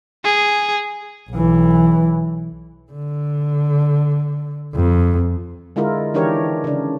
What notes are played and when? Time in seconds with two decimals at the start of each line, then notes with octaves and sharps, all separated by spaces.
0.24 G#4
1.31 B1 E3
2.92 D3
4.75 F2
5.76 D3 G#3 E4 F4 A#4
6.14 D#3 E3 D4 G4 A#4 C#5
6.64 C#3 D4